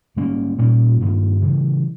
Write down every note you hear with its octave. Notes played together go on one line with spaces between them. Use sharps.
G#2 G3 A#3 C#4
A#2 G3 A#3 C#4
G2 D#3 A#3
C#3 E3 G3